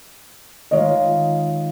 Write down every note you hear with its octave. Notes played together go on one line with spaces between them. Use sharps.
D#3 G#3 F4 C#5 D#5